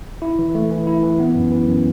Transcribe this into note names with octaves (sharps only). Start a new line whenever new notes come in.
E4
E3
A3
E3
E4
E3
B3
F#2
E3
F#2